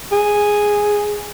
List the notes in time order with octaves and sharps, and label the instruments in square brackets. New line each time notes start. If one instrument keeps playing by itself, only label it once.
[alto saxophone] G#4